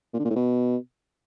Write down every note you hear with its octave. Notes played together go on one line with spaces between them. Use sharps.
A#2
D3
A#2
A2
B2